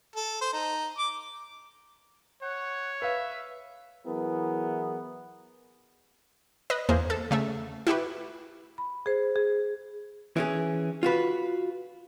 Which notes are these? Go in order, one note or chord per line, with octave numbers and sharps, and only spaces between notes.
A4
C5
D#4
D6
C#5 F#5
B4 E5 F5
E3 F#3 B3 E4 G#4 A#4
B4 D#5
E2 A#3 G#4 C5
A4
C#3 A3 E5
E4 F#4 G4 B4
B5
G#4 C5
G#4
E3 C#4 G#4
F4 F#4 B4